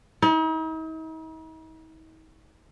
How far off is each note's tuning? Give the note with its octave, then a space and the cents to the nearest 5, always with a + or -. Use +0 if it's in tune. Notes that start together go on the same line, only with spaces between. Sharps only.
D#4 +45